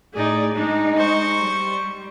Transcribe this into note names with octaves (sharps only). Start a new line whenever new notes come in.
A2 D#4 G#4 D5
G#3 D4 D#4
C5 C#6
G3